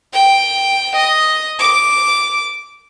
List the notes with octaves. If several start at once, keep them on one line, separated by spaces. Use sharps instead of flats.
G5
D#5
D6